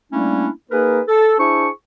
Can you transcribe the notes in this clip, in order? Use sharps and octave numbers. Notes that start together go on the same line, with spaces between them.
G3 A3 A#3 C#4 D4 E4
A#3 D#4 G#4 A#4 B4
A4
D4 E4 G#4 C5 C#6